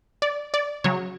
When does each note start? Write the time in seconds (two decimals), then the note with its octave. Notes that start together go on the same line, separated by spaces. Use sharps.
0.22 D5
0.54 D5
0.84 C#3 F#3 C#5